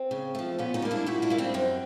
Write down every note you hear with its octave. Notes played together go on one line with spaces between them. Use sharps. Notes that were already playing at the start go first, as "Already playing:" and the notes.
Already playing: C4
C#3
F3 A3
A#2 B3 C#4
C#4 D#4
G3 A#3
D4 E4
A#2 E4 F#4
D4 E4
G3 A#3
C4 D4
F#2 C4